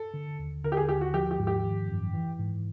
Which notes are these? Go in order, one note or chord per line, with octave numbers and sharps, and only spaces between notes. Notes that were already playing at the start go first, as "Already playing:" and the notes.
Already playing: A4
D3
D#2
D3 A#4
G4
G#4
D#2 G4
F#4
F3 G4
G4
G#2
G4
D#3
F#2
E3
G#2